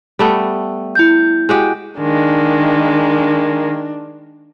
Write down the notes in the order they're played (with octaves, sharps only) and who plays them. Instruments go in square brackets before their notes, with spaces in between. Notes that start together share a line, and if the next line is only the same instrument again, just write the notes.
[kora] G3 A3 B3
[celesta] E4 G6
[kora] G#3 F#4 G4
[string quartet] D#3 G#3 A#3 [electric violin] D4